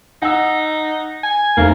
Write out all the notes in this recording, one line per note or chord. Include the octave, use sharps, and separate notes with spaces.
D#4 F#5 E6
G#5
F1 A#3